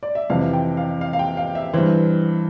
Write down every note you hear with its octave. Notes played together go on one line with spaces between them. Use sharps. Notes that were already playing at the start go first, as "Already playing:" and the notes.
D5
E5
F2 C3 E3 F5
G5
F5
F5
F5
G5
F5
E5
G2 E3 C5